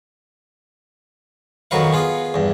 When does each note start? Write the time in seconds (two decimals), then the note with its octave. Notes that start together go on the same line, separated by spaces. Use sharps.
1.71 F2 D#3 F#3 F#4 B4 F5
1.93 B3 F4 G#4
2.34 E2 G2